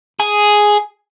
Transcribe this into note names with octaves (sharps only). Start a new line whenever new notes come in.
G#4